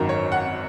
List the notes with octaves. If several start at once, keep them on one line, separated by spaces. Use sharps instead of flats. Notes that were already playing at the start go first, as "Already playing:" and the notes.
Already playing: G#1 F#2 D#3 A#5
C#5
F#5